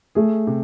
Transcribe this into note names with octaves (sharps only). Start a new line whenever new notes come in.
A3 G#4
C3